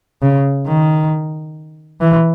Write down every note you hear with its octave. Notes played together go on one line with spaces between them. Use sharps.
C#3
D#3
E3